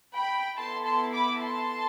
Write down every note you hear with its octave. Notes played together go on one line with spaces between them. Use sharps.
G5 B5
B3 E4 A4 A5 C6
A5 C6
B5 D6
A5 C6